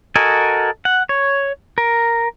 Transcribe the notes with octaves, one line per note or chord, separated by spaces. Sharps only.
F#4 A4 A#4 D#5 G#5
F#5
C#5
A#4